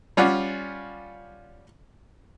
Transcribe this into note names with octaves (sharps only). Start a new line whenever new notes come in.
G3 C#4 F4 D5 F#5